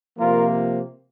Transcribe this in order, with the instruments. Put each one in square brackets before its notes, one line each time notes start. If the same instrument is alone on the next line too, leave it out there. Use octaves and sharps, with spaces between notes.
[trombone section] C3 F3 A#3 F4 A#4